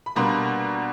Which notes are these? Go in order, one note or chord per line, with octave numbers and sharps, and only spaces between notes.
B5
B2 G3 A#3 D4 A#5 C6